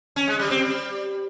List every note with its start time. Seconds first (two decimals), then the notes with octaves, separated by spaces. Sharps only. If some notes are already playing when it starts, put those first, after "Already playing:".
0.16 C#4
0.28 G#3
0.39 G3
0.51 C4
0.62 G3